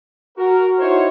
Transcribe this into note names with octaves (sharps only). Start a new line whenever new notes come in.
F#4 A#4
D#4 E4 F#4 C5 C#5